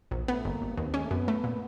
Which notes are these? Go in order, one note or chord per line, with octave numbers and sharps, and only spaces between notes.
A#1 E3
A3 B3
G1 A#3
G1
D#2 B3
C4
G#3 C#4
A3
F#2 B3
A3
A#2